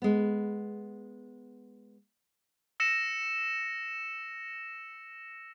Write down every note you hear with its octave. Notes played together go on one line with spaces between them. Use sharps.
G#3 B3
E6 A#6 C#7 E7